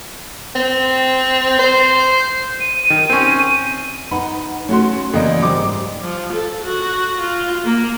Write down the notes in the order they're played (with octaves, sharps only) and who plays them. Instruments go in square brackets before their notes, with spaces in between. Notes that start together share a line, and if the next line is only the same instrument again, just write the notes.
[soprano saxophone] C4
C5
[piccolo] D#7
[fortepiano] D#3
C4 C#4
[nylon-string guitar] D#4 B4 F#5 [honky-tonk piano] B5
[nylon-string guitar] A3 [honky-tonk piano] C#4 F#4 C6
[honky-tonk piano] C#2 D#5 [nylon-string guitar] E3 A#3 D5
[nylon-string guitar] G#2 G3 G4 [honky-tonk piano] D6
[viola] F3
A4
F#4
F4
A#3